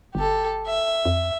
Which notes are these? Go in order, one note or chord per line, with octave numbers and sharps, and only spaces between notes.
G1 G4 A4
E5
F2